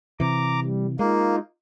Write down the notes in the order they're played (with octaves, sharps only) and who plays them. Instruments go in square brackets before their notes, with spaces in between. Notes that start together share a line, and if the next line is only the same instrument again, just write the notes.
[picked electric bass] C3 E3 [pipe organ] A#5 D6
[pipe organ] G3
[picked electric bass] G#3 [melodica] A#3 [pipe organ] D#4 F4